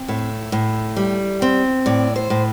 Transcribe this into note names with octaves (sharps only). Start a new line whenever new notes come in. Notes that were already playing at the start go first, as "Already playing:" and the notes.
Already playing: C4
A2 E5
A2
G3
C4
A2 D5
C5
A2